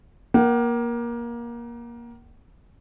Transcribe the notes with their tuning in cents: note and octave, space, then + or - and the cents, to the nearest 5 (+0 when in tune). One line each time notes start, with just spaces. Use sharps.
A#3 +20 F#5 +45